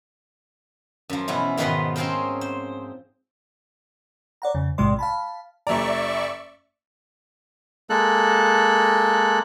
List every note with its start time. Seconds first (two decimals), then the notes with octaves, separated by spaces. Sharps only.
1.10 F#2 F3
1.28 B2 E3 C#4 E4
1.57 G#2 B2 D#3 F3 B4 C6
1.96 C4 C#4 F4 G#4 A#4 C5
2.41 C5
4.42 C#5 D5 F#5 A#5
4.55 F2 C#3
4.78 A#1 G#2 C3 G#3 D5 C6
4.99 F5 A5 B5
5.67 F#1 D5 E5 A#5 C#6
7.90 G#3 A#3 A4 F#6